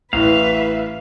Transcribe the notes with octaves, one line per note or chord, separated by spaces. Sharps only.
A1 E3 B4 E5 F5